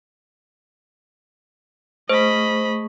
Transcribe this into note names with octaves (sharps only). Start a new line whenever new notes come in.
A3 G#4 C5 D#5 B5 C#6